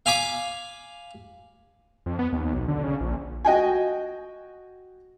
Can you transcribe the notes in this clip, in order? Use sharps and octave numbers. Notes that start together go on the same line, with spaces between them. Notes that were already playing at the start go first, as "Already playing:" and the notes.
F5 G#5 B5 D6
F2
B3
D#2
B1
D3
C#3
A#1
F#4 D#5 G5 G#5